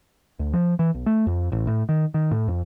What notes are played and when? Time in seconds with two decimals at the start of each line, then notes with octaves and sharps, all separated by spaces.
0.39 D2
0.53 F3
0.79 E3
0.94 B1
1.06 A3
1.27 F2
1.52 A1
1.67 A2
1.89 D#3
2.14 D#3
2.31 A2
2.48 F2